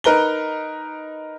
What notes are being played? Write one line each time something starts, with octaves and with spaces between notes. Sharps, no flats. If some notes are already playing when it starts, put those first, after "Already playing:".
D#4 A#4 B4 A#5 G7